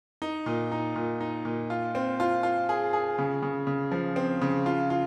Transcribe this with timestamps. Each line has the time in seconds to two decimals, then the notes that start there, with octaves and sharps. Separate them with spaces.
0.22 D#4
0.46 A#2
0.72 D#4
0.96 A#2
1.21 D#4
1.45 A#2
1.70 F4
1.95 C4
2.20 F4
2.43 F4
2.69 G#4
2.93 G#4
3.18 C#3
3.43 C#3
3.67 C#3
3.91 F3
4.16 C4
4.42 C#3
4.66 F4
4.90 F4